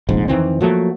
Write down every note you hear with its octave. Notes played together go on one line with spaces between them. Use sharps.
F1 A#1 G#2
F2 D#3 E3 C4
F3 F#3 A3 A#3